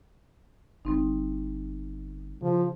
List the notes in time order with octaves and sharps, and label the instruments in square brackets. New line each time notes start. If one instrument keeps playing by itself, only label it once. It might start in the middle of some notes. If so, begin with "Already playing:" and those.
[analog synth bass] G1 [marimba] G3 C4 D#4
[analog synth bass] C#3 [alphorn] F3